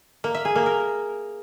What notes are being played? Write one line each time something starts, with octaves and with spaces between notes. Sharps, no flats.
A#3
E5
G#4
A#3
A#4